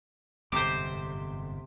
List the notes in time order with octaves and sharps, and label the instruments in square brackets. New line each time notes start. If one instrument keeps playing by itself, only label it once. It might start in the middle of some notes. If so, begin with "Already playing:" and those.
[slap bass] G1 F2 G#2 [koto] C3 C5 [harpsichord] D6